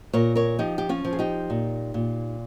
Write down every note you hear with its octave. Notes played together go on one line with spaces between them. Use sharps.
A#2 A#4 C#5
A#4 C#5
F3 D#4 G4
G4
C#4 F4
F3
G#4
D#4 G4
A#2
A#2